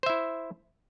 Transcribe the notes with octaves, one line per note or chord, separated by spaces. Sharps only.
E4 C5 E5